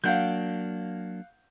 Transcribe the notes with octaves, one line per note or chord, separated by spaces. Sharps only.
F#3 A#3 D4 F5 F#5 G6